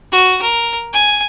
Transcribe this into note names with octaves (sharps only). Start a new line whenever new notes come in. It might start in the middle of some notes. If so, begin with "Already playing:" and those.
F#4
A#4
G#5